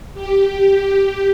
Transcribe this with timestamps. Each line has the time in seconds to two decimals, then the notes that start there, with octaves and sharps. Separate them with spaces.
0.14 G4